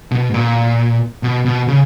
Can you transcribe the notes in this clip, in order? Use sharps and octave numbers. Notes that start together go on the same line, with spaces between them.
B2
G#2
A#2
B2
B2
C#3